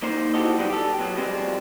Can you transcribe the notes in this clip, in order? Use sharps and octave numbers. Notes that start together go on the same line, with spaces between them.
A#3 D#4 C5
E4 F#4 G4 A4 D#5
F#3 G3 B3 D4 D#4 F#4
G4 A4
B2 F#3
F2 B2 G3 G#3 C4